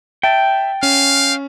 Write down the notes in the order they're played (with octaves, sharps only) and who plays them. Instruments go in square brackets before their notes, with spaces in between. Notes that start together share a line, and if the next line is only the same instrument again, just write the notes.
[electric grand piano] E5 A5 A6 [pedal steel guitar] G5
[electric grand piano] C#4 [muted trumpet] F5